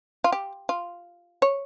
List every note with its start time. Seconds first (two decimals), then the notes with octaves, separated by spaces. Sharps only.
0.24 F4
0.32 G4
0.69 F4
1.42 C#5